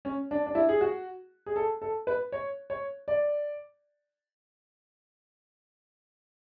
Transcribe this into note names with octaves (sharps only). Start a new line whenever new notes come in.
C#4
D4
D4
E4
G#4
F#4
G#4
A4
A4
B4
C#5
C#5
D5